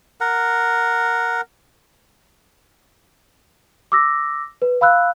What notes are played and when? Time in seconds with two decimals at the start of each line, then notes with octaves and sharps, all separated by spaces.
0.21 A#4 F#5
3.92 D6 E6 A#6
4.62 B4
4.81 F5 B5 E6 F#6